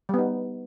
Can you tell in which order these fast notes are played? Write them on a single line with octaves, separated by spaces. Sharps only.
G3 B3 D#4